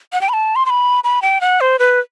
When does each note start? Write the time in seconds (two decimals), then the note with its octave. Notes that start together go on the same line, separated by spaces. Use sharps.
0.13 F#5
0.21 G5
0.29 B5
0.33 A5
0.56 C6
0.66 C6
0.70 B5
1.04 B5
1.22 G5
1.41 F#5
1.61 C5
1.79 B4